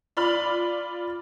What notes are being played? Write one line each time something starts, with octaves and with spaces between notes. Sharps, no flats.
F4 D5 B5 F6